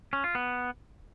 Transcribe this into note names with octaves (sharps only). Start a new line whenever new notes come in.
C#4
F4
B3